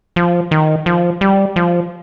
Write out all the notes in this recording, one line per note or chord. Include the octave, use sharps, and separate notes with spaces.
F3
D#3
F3
G3
F3